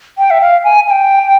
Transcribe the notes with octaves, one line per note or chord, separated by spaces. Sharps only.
G5
E5
F5
G#5
G#5
G5